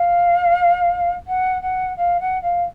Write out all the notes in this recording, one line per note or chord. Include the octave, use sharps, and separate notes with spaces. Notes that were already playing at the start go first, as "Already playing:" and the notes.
Already playing: F5
F#5
F#5
F5
F#5
F5